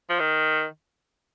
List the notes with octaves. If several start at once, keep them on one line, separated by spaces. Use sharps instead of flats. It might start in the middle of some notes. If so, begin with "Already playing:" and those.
F3
D#3